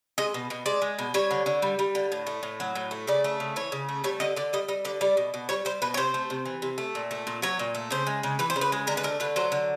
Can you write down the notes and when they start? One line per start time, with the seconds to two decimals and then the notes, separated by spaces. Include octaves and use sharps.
0.18 G#3 D#5
0.34 B2
0.50 B2
0.66 G#3 D5
0.82 G#3
0.99 B2
1.14 G3 C#5
1.31 D3
1.46 D3
1.62 G3
1.79 G3
1.95 D3
2.12 A2
2.27 A3
2.43 A2
2.60 F#3
2.75 A2
2.91 A3
3.07 C#3 D5
3.24 A3
3.40 C#3
3.56 E3 C#5
3.72 C#3
3.89 A3
4.04 G3 C#5
4.20 D3 D#5
4.36 D3 D5
4.53 G3 D#5
4.68 G3 D#5
4.85 D3 D5
5.01 G3 D5
5.17 B2
5.34 B2
5.49 G3 C#5
5.65 G3 C5
5.82 B2 B4
5.94 C#5
5.97 C3 C5
6.14 A3
6.30 C3
6.45 E3
6.62 C3
6.78 A3
6.95 A#2
7.11 A3
7.27 A#2
7.42 F#3 C#5
7.59 A#2
7.75 A3
7.90 C#3 C5
8.07 G#3
8.23 C#3
8.39 E3 B4
8.50 C5
8.56 C#3
8.61 B4
8.72 G#3
8.87 D3 A#4
8.97 B4
9.03 A3 A#4
9.20 D3 B4
9.36 F#3 C5
9.52 D3